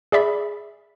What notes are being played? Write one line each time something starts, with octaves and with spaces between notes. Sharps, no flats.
G#4 D5 E5 B5